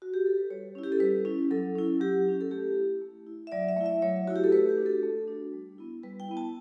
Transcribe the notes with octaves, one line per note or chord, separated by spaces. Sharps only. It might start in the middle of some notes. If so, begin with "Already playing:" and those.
F#4
G4
A4
B4
G3 C#5
C#4 E4
G4
A4
G3 B4
C#4 E4
F#3 A4
C#4 E4
F#3 G4
C#4 E4
A4
A3 G4
E4
A3
E4
E5
F#3 D5
E5
A3 E4
E5
F#3 C#5
A3 E4 F#4
G4
A4
A3 B4
G4
D4 F#4
A4
A3
D4 F#4
G3
B3 E4
G3 B4
G5
B3 E4
A5